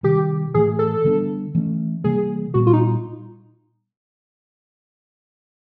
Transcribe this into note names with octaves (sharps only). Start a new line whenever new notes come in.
C3 D#3 G3 G4
A2 E3 A3 G#4
A4
D3 G3 B3 D4
E3 A3 C#4
C3 E3 G3 A#3 G#4
A#2 G3 B3 F#4
F4
D#4